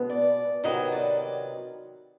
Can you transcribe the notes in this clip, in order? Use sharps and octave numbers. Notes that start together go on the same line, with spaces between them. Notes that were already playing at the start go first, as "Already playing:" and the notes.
Already playing: B2 G#3 B3
D5
C3 D#3 F#3 B3 D#5
D5